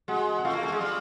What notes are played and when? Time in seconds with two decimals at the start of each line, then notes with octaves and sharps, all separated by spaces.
0.08 G#3 F#4 F#5
0.38 F#5
0.45 A3 F4 F5
0.53 A#3
0.63 A3
0.72 G#3
0.81 G3